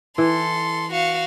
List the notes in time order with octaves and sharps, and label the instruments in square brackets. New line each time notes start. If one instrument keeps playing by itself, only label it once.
[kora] E3 [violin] A4 C6
[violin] F#4 F5